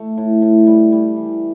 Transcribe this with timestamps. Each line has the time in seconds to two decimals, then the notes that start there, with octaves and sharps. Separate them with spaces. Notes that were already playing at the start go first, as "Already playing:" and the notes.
Already playing: A3
0.18 A2
0.42 A2
0.67 G3
0.92 G3
1.17 E3